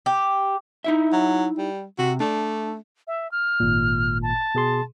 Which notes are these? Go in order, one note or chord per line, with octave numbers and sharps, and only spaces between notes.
G4
D#4 E4 E5
F#3
G3
C3 F#4
A3 D4
E5
F6
G#1 A#2
A5
B2 G#4 C6